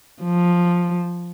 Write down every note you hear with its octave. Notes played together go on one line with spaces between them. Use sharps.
F3